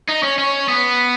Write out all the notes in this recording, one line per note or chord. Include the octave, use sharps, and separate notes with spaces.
D#4
C#4
C#4
B3